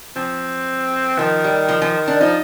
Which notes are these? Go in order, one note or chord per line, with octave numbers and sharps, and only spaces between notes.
F3 C4
D#3 F3
G3
F3
F3
D4
F3 D#4